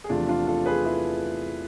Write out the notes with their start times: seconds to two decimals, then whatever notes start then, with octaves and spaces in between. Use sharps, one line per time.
0.04 G#4
0.09 E2 C3 F3 A3 D4 F4
0.29 D4 F4
0.47 F4 A4
0.66 G#4 B4
0.84 E4 G#4